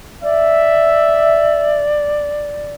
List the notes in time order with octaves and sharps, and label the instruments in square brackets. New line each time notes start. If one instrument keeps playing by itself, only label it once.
[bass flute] D5 [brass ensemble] E5